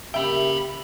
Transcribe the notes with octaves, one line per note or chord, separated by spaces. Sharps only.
C#3 A#3 G4 E5 G5 B5